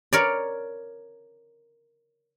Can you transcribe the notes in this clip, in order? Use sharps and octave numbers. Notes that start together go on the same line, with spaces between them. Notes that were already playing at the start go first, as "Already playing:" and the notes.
A#4 C#5 D5